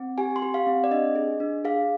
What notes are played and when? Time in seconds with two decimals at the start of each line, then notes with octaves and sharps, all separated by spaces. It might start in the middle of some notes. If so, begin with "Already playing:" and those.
Already playing: C4
0.18 G4 G#5
0.36 C6
0.42 G4
0.54 F5
0.67 C4
0.84 D5
0.91 D4 D#5
1.15 G#4
1.40 D4
1.65 G#4 F5